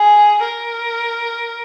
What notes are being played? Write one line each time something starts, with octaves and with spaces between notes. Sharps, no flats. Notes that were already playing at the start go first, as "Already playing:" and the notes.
Already playing: G#4
A#4